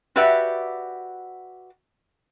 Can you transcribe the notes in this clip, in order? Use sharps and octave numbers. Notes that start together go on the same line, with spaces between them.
F#4 G4 B4 D5 E5 F#5